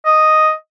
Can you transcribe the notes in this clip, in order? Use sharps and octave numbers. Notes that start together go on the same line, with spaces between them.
D#5